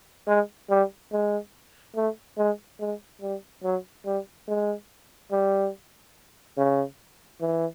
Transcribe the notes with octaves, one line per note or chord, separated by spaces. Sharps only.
G#3
G3
G#3
A3
G#3
G#3
G3
F#3
G3
G#3
G3
C#3
E3